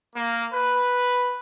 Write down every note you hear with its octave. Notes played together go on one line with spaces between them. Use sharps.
A#3
B4